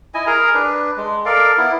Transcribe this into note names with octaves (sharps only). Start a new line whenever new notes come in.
E4 D#5 G#5
G#4 A#4 A#5
D4 B4
G#3
A4 A#4 D5 F5
B3 E4